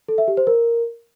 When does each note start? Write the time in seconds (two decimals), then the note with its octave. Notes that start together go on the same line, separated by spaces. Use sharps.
0.08 A4
0.18 E5
0.28 G4
0.37 C5
0.47 A#4